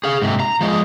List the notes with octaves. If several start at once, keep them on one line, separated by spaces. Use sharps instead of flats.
G#4 F5
G#2 C3
A#5
F3 G#3